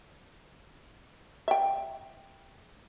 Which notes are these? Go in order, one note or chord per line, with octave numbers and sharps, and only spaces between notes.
E5 G5